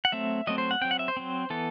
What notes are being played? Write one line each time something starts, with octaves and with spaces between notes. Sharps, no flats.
F#5
F#3 A3 C4 E5
F#3 A3 C4 D#5
C5
F#5
F#3 C4 G5
F#5
E5
C5
F#3 C4
E3 B3 A4